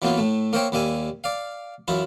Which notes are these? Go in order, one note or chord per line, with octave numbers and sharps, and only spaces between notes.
E3 F#3 A#3 B3 F4
A2 A3
A#3 A#4 C5 C#5 E5 G5
D#2 G3 A#3 E5 G#5
D5 F5
F#2 E3 E4 F4